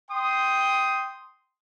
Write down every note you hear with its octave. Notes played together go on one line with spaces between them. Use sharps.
G5 C6 D#6